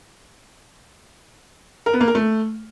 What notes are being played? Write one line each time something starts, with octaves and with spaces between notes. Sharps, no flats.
A#4
B3
A#3
A#4
A3